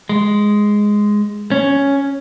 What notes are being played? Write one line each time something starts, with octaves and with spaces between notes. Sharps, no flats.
G#3
C#4